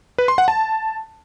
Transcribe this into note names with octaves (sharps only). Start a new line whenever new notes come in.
B4
C6
F#5
A5